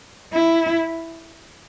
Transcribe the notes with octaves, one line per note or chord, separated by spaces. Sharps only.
E4